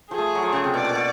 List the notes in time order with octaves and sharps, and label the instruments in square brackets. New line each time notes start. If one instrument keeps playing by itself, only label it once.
[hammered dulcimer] F3 [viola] G#4
[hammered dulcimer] A3
F#3
F3
C#3
C3
[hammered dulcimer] B2 [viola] D5
[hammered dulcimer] A#2
B2